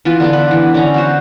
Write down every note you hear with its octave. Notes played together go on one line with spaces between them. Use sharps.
E3 B3 F4 B4
D3 B3 D4
B4
E3
D3 C#4 D#4 A#5
B3 F#4 C5